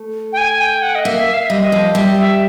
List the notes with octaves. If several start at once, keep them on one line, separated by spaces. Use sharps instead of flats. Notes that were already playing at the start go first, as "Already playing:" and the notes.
Already playing: A3
G5
G#5
G5
F#5
D#5
A#3 E5
F5
E5
G3 D#5
F3
G3 E5
E5